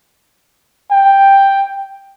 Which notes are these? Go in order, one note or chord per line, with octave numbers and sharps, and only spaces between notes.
G5